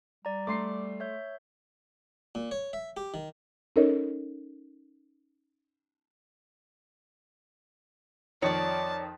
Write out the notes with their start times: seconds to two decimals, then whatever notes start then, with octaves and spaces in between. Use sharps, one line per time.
0.25 G3 D5 A#5
0.47 A3 C6 D6 C7
1.00 C#5 E5 G6
2.35 A#2
2.51 C#5
2.73 E5
2.97 G4
3.14 D#3
3.76 C#4 D#4 A4 A#4 C#5 D#5
8.42 F2 D#3 C#5 D5 A5